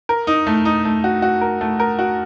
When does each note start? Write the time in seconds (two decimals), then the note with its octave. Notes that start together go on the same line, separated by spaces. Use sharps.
0.09 A#4
0.27 D#4
0.47 A3
0.65 D#4
0.85 A3
1.04 F#4
1.22 F#4
1.41 A#4
1.61 A3
1.80 A#4
1.99 F#4